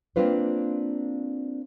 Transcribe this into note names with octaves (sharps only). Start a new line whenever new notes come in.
A#3 C4 D4 F4 B4 C5